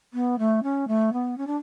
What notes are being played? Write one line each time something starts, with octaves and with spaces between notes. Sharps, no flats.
B3
A3
C#4
A3
B3
C#4
D4